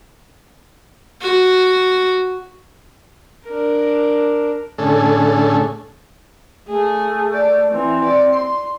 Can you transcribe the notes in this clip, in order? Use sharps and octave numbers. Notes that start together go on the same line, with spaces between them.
F#4
D4 A#4
A2 D3 C#4 G#4 A4
A3 G#4
D5
E3 C4
D5
C6